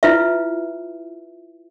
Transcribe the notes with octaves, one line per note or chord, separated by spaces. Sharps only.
E4 F4 B4 E5